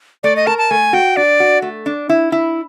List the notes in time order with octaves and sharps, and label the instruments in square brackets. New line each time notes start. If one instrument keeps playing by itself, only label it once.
[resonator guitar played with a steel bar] A3 [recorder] D5
[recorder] D#5
[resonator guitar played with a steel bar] A#4 [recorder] A5
[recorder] A5
[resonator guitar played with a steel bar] A3 [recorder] G#5
[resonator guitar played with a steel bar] F#4 [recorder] G5
[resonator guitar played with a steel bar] D4 [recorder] D5
[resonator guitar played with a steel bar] F#4
A3
D4
E4
E4